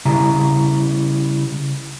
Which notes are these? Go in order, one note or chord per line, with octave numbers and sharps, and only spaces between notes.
C#3 G3 E4 G#5 A#5